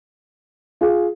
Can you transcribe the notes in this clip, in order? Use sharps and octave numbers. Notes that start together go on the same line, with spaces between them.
F4 G#4